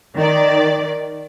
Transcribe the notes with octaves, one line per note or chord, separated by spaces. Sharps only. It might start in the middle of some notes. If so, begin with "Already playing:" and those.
D#3 D5